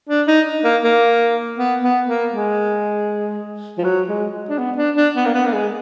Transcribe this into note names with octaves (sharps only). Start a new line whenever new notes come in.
D4
D#4
A#3
A#3
B3
B3
A#3
G#3
F3
F#3
G#3
D4
B3
D4
D4
B3
A#3
B3
A#3
G#3